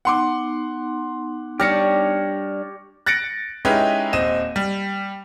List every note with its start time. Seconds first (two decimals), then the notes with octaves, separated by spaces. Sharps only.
0.05 B3 D#4 F#5 C6 D6
1.60 G3 D4 G4 C#5 F6 A#6 C#7
3.06 F#6 A6 A#6 C#7 D7
3.65 G#3 C#4 D#4 E4 G4 B4
4.13 D#1 C4 D#5 D#7 E7
4.56 G3